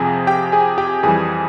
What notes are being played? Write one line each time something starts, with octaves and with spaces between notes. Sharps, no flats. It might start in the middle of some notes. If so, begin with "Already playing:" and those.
Already playing: F2 C3 F3 G#4 G#5
G4 G5
G#4 G#5
G4 G5
F2 E3 G3 G#4 G#5